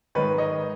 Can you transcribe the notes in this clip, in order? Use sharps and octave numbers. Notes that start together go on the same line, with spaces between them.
G#2 D#3 B4 C#5
C#5 D#5